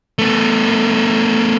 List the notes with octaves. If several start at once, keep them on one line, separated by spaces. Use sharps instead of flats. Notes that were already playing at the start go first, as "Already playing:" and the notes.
A3 B3